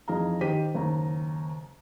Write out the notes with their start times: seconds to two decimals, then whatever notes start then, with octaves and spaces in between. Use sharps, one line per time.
0.08 F2 E3 D#4 G#4 F5 A#5
0.41 D#3 G4 C5 B6 D#7
0.74 F#1 D#2 A#5